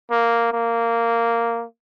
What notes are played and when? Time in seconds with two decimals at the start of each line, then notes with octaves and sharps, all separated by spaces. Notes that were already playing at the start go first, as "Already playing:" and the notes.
0.11 A#3
0.52 A#3